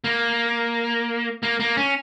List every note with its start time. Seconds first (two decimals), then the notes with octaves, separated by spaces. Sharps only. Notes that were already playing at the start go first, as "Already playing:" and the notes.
0.04 A#3
1.43 A#3
1.60 A#3
1.77 C#4